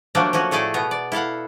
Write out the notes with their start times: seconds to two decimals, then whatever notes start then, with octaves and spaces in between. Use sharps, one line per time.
0.15 D3 F3 F#3 A3 A#3 D4
0.33 F3 F#3 C#4 F#4
0.51 A2 A3 G#4 A4 D5
0.74 B2 B3 A#5
0.91 D5
1.12 E4 A4 F5 F#5